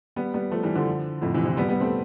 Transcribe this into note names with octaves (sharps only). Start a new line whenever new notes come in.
G3 B3
G3 B3
F3 A3
E3 G3
D3 F3
F2 A2
C3 E3
C3 E3
G3 B3
G3 B3
A3 C4